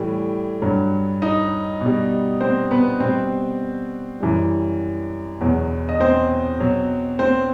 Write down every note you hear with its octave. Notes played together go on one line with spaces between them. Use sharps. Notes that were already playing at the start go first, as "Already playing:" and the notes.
Already playing: A2 E3 G3
G2 F#3
D#4 D#5
B2 G3
C4 C5
B3 B4
B2 G3 C4 C5
F#2 E3 G3
E2 B2 F#3
D#5
C4 C5
B2 F#3
C4 C5